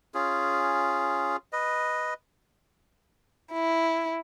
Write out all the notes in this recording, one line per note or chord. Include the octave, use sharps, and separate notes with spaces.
C#4 F4 G#4
B4 D#5
E4